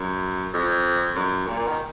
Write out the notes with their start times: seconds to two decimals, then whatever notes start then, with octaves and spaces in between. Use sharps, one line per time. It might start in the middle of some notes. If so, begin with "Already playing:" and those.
Already playing: F#2
0.54 F2
1.16 F#2
1.47 A#2
1.68 D#3